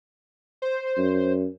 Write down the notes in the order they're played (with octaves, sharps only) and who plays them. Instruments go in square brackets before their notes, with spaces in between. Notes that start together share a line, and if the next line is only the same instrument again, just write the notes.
[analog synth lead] C5
[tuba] F#2